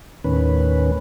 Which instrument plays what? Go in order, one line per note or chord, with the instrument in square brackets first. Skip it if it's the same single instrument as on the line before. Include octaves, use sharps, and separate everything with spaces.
[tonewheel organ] D#2 A2 D#3 C#4 B4